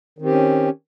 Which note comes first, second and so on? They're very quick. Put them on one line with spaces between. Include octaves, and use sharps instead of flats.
D#3 C4 G4 C#4